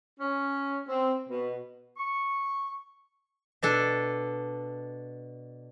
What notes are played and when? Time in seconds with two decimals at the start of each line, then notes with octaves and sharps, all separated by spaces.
0.19 C#4
0.87 C4
1.27 B2
1.97 C#6
3.62 B2 D4 A4